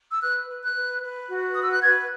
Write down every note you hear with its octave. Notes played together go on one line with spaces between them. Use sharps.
E6
B4 F#6
B4
F#6
B4
B4
F#4
B4 D#6
E6
F#6
B4 G#6